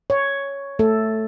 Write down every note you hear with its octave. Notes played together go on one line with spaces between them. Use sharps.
C#5
A3 A4